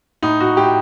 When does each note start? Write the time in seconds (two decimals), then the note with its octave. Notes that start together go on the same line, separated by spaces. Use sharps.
0.23 A2 D#4
0.40 A2 F#4
0.57 A2 G4